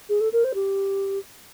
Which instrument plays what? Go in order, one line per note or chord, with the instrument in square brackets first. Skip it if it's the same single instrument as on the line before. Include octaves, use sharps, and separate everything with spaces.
[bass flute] G#4
A4
A#4
C5
G4